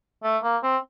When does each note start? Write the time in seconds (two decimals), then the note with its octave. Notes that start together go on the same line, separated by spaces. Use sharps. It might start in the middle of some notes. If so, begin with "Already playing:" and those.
0.24 A3
0.43 A#3
0.63 C4